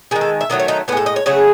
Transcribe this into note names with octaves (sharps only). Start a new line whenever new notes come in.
D#3 G#3 G#4
A4
E5
D#3 F#3 A3 D#5
C#5
D#4
A2 G#3 B3 A4
D#5
C#5
C#3 F#3 A3 G#4